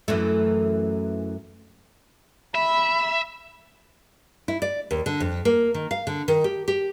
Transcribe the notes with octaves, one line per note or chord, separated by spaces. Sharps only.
F#2 E3 A3
E5 B5
E4
D5
D#2
D3
F2
A#3
D#3
F5
D3
D#3
G4
G4